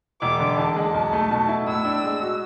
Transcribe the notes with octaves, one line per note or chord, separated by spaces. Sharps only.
E1 D6
D3
E2 A5
G#3
B1
A3
B2
E4
A2 E6
D4
G#3
F#4